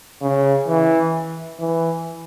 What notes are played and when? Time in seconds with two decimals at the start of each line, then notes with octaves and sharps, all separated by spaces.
0.22 C#3
0.67 E3
1.60 E3